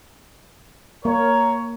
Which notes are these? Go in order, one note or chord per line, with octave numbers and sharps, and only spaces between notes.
A#3 A#4 C#5